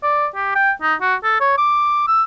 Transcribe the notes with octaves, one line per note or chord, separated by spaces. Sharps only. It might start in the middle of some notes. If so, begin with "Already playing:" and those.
D5
G4
G5
D#4
F#4
A4
C#5
D6
E6